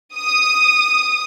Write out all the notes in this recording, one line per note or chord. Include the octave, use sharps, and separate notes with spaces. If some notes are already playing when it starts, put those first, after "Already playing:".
D#6